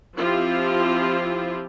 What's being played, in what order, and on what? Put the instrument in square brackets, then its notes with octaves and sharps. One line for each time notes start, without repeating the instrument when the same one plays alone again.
[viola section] F3 C4 E4 F4 G4